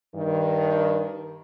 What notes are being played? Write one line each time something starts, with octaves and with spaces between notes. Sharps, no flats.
G2 D#3